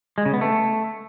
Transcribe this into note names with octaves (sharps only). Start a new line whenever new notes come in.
G#3
C#3
B3
A3